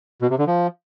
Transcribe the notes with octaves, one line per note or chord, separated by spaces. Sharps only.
B2
C3
D3
F3